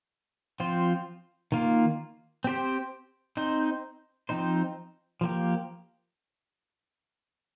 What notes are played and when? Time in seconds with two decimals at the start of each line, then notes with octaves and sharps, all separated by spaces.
0.60 F3 C4 F4 C5
1.52 D#3 A#3 F4
2.44 C4 G4 C5
3.37 C4 D#4 C5
4.29 F3 C4 D#4 C5
5.21 F3 A#3 G4